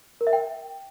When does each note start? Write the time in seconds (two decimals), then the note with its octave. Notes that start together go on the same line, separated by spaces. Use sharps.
0.21 A#4
0.27 E5
0.33 G5